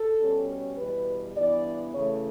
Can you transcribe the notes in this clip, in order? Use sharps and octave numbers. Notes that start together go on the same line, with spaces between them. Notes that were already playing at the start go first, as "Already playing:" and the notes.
Already playing: A4
B2 G3 C#4
E2 B2 G3 B4
G2 E3 B3 D5
C#3 E3 A3 C#5